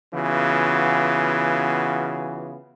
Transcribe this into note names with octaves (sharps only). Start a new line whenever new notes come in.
C#3 E3 B3 F4 F#4